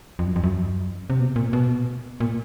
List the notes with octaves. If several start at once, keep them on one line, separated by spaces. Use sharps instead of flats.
F2
F#2
F2
F#2
C3
B2
A#2
B2
A#2